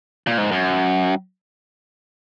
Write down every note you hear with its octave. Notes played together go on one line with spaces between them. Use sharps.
A#2
G#2
F#2